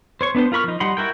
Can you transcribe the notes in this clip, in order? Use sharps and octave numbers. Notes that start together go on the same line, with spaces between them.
C5 C#5 C#6
B3 D4 B4 C5
F4 A#4 B5 C#6 F6
F3 D#4
G3 D#4 F#5 B5 C6
E4 F#4 A#4 G5